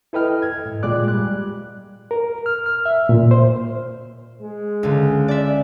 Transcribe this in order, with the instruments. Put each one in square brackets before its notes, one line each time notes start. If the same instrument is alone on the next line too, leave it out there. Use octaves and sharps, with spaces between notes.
[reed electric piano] E4 A4 B4 D#5 G5 F6
G#6
G#2
A#2 G#3 F4 D5 D6 F#6
G3 F#6
A#4
F6
F6
E5
A#2
C5
[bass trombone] G#3
[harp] C#2 D3
D5 E5